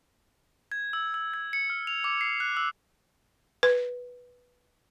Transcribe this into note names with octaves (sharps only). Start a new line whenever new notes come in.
G#6
E6
E6
G#6
C#7
F6
F7
D6
C7
F#6
E6
B4